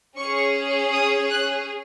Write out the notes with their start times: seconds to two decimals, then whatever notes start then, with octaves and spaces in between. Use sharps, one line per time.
0.17 C#4 G#4 C#6
0.92 D#6
1.30 F#6